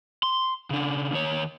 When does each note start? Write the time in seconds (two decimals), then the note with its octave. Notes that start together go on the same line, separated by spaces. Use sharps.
0.23 C6
0.70 C#3 D4
1.12 D#2 C#5